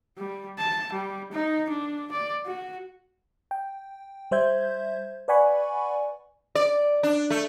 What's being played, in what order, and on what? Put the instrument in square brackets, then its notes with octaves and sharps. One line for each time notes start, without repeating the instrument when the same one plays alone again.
[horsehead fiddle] G3
A5
G3
D#4
D4
D5
F#4
[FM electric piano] G5
G3 C5 E5 G6 G#6
B4 D5 F#5 G#5 B5 C#6
[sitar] D5
D4
A3